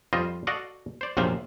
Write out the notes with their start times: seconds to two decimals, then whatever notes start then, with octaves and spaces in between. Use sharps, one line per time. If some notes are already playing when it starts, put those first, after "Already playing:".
0.13 F2 G3 F4 C5 D#5
0.47 F#4 A4 D5 D#5 F5
1.01 C5 D5
1.17 A#1 F#2 C3 A3 C5 F5